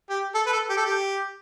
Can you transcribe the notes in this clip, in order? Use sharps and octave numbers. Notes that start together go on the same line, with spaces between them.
G4
A4
B4
A4
G4
A4
G4